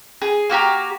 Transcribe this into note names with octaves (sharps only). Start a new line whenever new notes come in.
G#4
A#3 F#4 G4 A#5